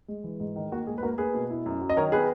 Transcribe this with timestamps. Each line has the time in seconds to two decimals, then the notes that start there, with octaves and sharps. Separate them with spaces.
0.08 G#3
0.24 E3
0.40 G#2
0.56 D#3
0.72 A#3 F#4
0.87 G#2 G#4
0.98 B4
1.03 A#3 F#4 A#4
1.18 A#3 G#4 B4
1.34 B2
1.50 E4
1.66 F#2
1.81 F#3
1.90 D#5
1.97 D#3 A#4 C#5
2.12 B3 G#4 B4